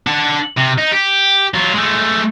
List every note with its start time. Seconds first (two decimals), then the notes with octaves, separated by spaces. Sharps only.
0.07 D4 F#5
0.58 C3
0.78 D#4
0.91 G4
1.54 F#3 F4
1.74 G#3 A3